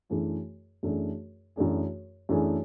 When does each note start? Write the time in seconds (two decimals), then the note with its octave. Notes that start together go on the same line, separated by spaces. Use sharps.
0.10 F#2 E3 A3 D4 G#4
0.83 F#2 E3 A3 D4 G#4
1.56 F#2 E3 A3 D4 G#4
2.29 F#2 E3 A3 D4 G#4